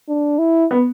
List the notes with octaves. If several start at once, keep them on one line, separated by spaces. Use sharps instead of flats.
D4
E4
B3